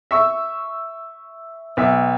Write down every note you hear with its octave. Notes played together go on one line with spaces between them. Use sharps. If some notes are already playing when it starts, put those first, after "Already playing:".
E5 C#6 E6
B1 E5